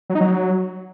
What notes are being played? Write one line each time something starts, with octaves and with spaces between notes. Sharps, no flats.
F#3
D#4
F#3